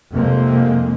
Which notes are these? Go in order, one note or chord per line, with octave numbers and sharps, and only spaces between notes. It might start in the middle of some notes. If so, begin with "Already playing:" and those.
F1 F2 C3 G#3 A#3 C4